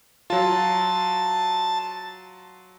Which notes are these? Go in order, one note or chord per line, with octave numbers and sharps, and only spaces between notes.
F#3 F4 A5